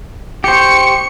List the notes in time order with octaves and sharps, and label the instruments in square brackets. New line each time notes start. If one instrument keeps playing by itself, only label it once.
[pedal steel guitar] G4 C5 [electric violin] C#6 C#7